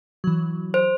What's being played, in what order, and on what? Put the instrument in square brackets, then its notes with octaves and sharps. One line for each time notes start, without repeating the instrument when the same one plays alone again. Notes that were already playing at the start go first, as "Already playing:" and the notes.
[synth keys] E3 F#3
[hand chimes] C5